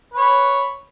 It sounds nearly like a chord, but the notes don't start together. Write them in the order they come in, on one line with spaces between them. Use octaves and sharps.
B4 C#5 B5